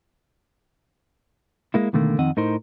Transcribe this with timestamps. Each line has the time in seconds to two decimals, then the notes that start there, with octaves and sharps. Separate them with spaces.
1.74 G#3 A#3 E4
1.93 B2 D3 D#3 A3 A#3
2.18 F2 D#3 C4 D#5 F#5
2.37 A2 D#4 A#4 C5